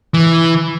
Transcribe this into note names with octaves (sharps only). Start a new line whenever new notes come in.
E3